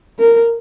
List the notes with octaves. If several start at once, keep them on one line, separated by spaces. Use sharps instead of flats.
A#4